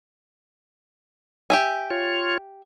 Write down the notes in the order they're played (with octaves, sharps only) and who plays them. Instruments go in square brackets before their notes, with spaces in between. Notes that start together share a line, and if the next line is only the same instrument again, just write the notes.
[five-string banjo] G4 E5 G#5
[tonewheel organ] F4 C#5